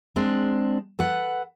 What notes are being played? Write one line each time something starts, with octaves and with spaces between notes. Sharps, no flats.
G#3 C4 D4
A4 B4 F#5